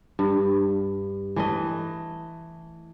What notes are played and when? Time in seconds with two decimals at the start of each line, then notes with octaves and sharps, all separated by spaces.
0.19 G2
1.36 E3 A3 D#5